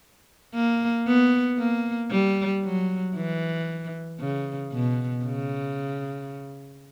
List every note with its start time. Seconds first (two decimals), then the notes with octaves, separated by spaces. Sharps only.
0.55 A#3
1.07 B3
1.58 A#3
2.11 G3
2.64 F#3
3.16 E3
4.20 C#3
4.73 B2
5.25 C#3